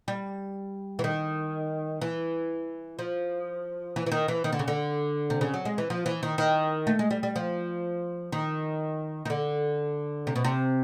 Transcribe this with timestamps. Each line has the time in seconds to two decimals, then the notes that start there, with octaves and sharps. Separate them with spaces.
0.08 G3
0.99 E3
1.04 D#3
2.01 E3
2.99 F3
3.96 E3
4.06 E3
4.12 D#3
4.28 E3
4.44 D#3
4.53 D3
4.59 C#3
4.68 D3
5.30 C3
5.41 C#3
5.54 F#3
5.65 G#3
5.78 E3
5.90 F3
6.06 E3
6.23 D#3
6.38 D#3
6.87 A3
6.99 G#3
7.10 G3
7.23 G3
7.36 F3
8.32 D#3
9.25 D#3
9.30 D3
10.27 C3
10.36 B2
10.44 C3